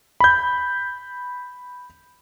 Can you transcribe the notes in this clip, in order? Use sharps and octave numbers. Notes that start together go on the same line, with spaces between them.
B5 G6